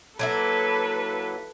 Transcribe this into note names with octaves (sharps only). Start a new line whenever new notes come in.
F#3 A#3 E4 A4 B4